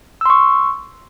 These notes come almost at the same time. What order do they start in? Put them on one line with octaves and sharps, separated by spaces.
E6 C6 C#6